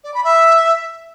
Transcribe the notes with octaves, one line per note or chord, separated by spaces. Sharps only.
D5
B5
E5